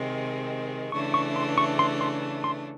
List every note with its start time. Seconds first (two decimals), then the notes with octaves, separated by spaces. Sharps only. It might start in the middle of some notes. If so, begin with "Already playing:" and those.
Already playing: C3 D#3 G#3 C4
0.92 C#3 E3 A3 D4 C#6
1.14 C#6
1.36 C6
1.58 C#6
1.79 C6
2.01 C6
2.44 C6